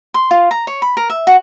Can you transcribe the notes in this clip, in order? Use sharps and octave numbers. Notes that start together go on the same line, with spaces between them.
C6
F4
A#5
C#5
B5
A#4
E5
F#4